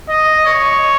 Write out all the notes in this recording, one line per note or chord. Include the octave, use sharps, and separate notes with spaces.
D#5
C#5